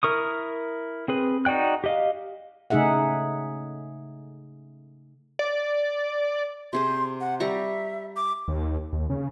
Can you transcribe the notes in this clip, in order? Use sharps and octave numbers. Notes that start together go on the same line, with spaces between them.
E4 A#4 C#6 D#6
C4 G#4 B4
D#4 F#4 D5 G5 F#6
G4 D#5 F5
C#3 A3 D#4 G#4 E5 F#5
D5
C3 G#4 C5 C6
F#5
G3 E5 A#5 C#6
D6
D#2
D#2
C#3